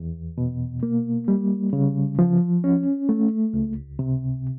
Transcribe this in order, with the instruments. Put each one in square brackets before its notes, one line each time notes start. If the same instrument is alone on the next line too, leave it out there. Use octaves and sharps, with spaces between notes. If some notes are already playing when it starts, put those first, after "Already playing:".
Already playing: [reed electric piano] E2
B2
A#3
G3
C#3
F3
C#4
A3
C#2
C3